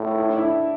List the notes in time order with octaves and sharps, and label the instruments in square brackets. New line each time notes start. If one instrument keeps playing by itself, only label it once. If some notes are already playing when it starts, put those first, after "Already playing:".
Already playing: [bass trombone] A2
[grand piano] E4
D4
E4